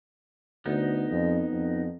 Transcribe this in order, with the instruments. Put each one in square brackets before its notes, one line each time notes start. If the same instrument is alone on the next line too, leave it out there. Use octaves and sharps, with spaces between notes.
[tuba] D2 [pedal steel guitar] B3 D#4
[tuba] F2
F2